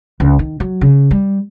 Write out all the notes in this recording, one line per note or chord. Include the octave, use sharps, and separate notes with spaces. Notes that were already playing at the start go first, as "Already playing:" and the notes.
C#2
D#3
F#3
C#3
G3